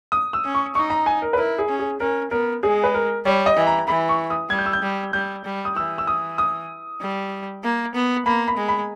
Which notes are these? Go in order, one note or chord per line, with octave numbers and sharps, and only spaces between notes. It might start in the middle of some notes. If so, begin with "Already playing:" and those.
D#6
E6
C#4
C#6
D#4 C#6
A#5
G#5
A#4
B4
E4 A#4
G#4
C#4
G#4
C#4 A#4
B3 A#4
G#3 G#4
B4
A#4
G3 C#5
D#5
E3
A#5
E3 B5
C#6
D#6
G3 G#6
G6
E6
G6
G3
G3 G6
G3
D#6
E3 E6
E6
D#6
D#6
G3
A#3
B3
A#3 B5
B5
G#3
B5